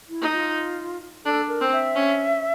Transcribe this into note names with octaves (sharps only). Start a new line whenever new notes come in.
E4
D#4
F4
D4 A4
A#4
C4
E5
C#4